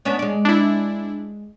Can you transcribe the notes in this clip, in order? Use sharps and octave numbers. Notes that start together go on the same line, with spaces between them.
B3 C#4 D4
G#3 D5
D4 E4